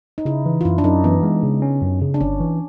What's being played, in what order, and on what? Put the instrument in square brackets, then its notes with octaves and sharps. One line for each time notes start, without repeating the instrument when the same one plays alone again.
[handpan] D#4
[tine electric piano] C#3 [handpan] E4
[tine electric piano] E3
[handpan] F4
[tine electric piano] F#2 [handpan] E4
[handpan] D4
[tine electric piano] F#2 [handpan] D#4
[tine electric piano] E3 [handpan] B3
[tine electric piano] G#3
C#3
C#4
F#2
C#3
[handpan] D4
[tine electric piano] G1 [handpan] C#4
[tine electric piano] E3